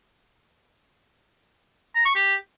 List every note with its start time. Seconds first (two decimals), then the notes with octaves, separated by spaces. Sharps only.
1.95 A#5
2.05 C#6
2.15 G4